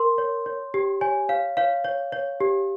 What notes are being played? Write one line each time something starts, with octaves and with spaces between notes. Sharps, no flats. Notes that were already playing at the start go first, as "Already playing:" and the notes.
Already playing: A#4 C6
C#5
C#5
G4
C#5 G#5
C#5 F5
C#5 F5
C#5
C#5
G4